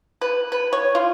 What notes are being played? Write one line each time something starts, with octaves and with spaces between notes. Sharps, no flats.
B4
B4
C#5
F4